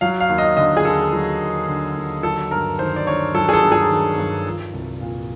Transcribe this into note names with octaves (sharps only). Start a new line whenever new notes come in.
F#3 F5
F5
D#2
D#5
D3 D#5
G#4
D#2 A4
F#3
D#2
D3
D#2
F#3 A4
G2 A#4
D#3 C5
D5
G2 C#5
F#3 A4
G#4
A4
G2
G#4
D#3
G2
F3
C2
A#2